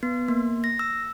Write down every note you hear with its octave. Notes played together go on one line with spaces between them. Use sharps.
B3
A#3
A#6
E6